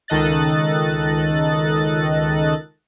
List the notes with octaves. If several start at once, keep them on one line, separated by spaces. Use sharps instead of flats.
C#2 D#3 A4 D#5 F#6 A6